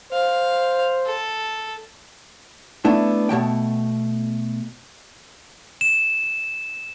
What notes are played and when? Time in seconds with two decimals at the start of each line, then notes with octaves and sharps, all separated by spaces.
0.13 C5 F5
1.06 A4
2.85 A3 B3 D4 E4
3.29 B2 G#3 A3 G5
5.81 E7